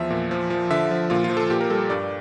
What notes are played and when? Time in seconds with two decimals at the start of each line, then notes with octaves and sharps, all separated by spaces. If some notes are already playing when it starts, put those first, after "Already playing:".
Already playing: E2 F3 E5
0.10 A#2
0.31 F3
0.50 F3
0.70 D3 E5
0.91 F3
1.10 A#2 F4
1.24 F4
1.30 F3
1.37 A4
1.50 A#2 G4
1.61 A#4
1.70 G3 A4
1.90 G2 D5